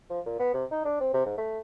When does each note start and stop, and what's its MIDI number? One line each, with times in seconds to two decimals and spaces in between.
0.10 0.20 53
0.26 0.36 46
0.39 0.53 59
0.54 0.65 48
0.71 0.81 63
0.85 0.96 62
1.00 1.10 60
1.14 1.24 48
1.26 1.35 44
1.38 1.59 57